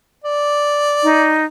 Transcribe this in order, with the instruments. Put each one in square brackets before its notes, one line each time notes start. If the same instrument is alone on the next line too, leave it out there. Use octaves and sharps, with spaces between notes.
[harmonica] D5
[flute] D#4